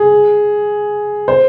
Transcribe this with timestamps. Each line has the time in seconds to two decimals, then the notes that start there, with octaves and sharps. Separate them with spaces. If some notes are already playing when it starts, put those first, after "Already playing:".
Already playing: G#4
1.28 C5